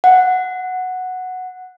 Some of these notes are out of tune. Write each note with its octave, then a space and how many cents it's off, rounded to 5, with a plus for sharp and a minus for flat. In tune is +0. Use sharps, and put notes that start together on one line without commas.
F#5 -5